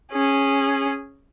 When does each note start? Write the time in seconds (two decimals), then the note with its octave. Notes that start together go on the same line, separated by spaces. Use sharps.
0.12 C#4 G#4